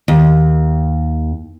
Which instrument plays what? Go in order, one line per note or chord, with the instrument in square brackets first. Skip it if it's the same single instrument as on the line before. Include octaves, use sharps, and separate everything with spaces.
[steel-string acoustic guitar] D#2